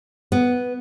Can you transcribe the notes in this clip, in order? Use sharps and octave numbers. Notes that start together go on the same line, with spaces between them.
B3